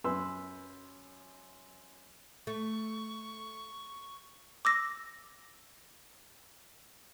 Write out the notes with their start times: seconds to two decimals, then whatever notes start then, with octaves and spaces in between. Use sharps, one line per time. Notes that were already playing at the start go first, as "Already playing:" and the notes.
0.04 F#2 B4 C6 E6
2.47 A3 C#6
4.65 D6 E6 A#6